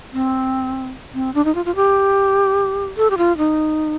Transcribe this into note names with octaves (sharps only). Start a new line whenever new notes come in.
C4
C4
D4
D#4
F4
F4
G4
A4
G4
F4
D#4